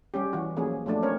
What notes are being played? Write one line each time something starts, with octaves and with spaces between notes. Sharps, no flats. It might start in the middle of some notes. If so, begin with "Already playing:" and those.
G3 C#4 G4
E3 F#4
F3 F#3 A#3 C#4 G#4
F3 F#3 A3 D4
C4 C#4 A#4 C#5